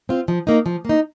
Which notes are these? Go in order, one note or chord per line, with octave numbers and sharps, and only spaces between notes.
C4 F4
F3
A#3 D#4
F3
A#3 D#4